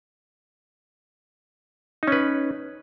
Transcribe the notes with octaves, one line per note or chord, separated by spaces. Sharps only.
C#4 D#4 B4